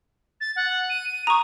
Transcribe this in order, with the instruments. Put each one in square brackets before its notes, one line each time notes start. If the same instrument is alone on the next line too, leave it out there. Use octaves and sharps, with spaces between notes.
[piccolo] A6
F#5
D#7
[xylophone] A#5 C#6 [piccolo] D#6